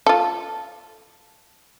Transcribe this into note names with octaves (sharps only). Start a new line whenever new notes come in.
F4 A4